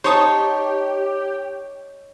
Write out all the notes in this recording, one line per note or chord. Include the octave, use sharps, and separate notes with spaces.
D#4 G4 C5 C#5 A5 C#6 D#6